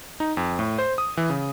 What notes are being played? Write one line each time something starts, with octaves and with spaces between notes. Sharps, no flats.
D#4
F2
A2
C5
D#6
E3
C#3